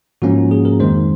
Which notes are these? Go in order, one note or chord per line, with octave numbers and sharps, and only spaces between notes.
G#2 F3 A#3 C#4 F#4
G#4
A#4
F2 D#3 G#3 D#4 C5